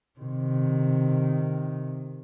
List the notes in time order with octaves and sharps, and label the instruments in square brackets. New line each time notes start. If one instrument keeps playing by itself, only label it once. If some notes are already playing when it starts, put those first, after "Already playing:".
[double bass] C3 D#3